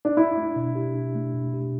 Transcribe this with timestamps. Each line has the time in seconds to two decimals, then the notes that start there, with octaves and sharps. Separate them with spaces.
0.05 D4
0.17 D4 E4
0.37 A3
0.56 B2
0.75 G4
0.95 D4
1.15 A3
1.34 B2
1.54 G4